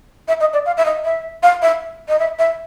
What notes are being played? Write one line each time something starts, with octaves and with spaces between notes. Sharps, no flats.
E5
D#5
D5
F5
E5
D#5
E5
F5
E5
D#5
E5
E5